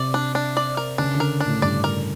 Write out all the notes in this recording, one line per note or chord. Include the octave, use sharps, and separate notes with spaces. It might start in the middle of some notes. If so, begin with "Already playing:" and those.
Already playing: C3 D5
D4
D4
D5
A#4
C#3 D4
D3
A#4
D4
A2
G2 D5
A#4